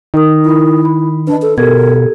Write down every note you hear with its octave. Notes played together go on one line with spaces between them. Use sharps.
D#3 D#4 A#4 D#6
E4
B5
D4 B4 D#5
A4
B2 G4 A4 A#4 G#6